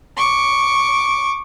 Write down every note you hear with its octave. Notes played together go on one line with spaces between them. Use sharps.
C#6 D6